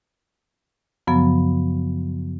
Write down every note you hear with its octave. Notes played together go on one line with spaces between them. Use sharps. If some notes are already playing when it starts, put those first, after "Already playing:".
F#2 C#3 F3 F#3 B3